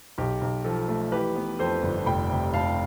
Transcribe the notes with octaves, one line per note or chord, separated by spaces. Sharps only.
B1 G4
B1
F3 A4
A3
E3 G4 B4
B3
F2 A4 C5
G1
F1 G5 B5
C3
F1 F5 A5